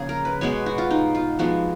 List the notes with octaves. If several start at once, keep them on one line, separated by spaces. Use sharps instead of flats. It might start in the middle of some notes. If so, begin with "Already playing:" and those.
Already playing: C#3 F3 A#3 G#4
A#4
B4
B2 G#3 B3 C#5
F#4
F4
D#4
F4
F3 G#3 B3 F#4